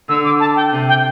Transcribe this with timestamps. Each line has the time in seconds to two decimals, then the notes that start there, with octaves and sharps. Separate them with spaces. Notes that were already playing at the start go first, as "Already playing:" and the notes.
0.09 D3 E6
0.25 D6
0.40 A5
0.56 G5
0.72 C3
0.89 G5